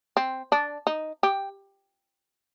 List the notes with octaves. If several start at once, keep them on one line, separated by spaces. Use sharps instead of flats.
C4
D4
D#4
G4